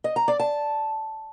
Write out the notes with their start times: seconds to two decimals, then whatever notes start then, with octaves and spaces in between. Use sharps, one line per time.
0.04 D#5
0.16 A#5
0.28 D5
0.40 A5